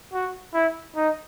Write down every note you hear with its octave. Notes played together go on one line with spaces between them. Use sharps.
F#4
E4
D#4